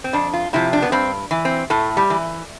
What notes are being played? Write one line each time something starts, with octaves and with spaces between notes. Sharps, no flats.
C4
F2 D4
F4
C3 F3 E4
D4
B3
G2 C4
E3
C4
A2 A3
G3
E3